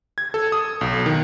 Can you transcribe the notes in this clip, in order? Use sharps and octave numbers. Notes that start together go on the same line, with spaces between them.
G#6
A4
D#6
B1
D#3